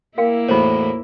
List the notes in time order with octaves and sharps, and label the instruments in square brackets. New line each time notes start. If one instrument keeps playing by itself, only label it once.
[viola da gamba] A#3 E4 [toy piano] A#4 F5 G5
[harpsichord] E2 A2 F#4 [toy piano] D#4 C#5 [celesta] C5 B5